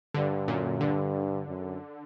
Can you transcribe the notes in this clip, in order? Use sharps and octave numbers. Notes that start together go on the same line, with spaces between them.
G2 D3
F#2 A#2
G2 D3
F#2